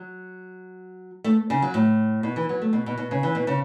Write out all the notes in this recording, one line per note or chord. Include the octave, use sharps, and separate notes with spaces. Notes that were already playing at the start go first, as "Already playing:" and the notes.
Already playing: F#3
A3
C#3
F#3
A2
B2
E3
F#3
A3
B2
B2
B2
C#3
E3
B2
C#3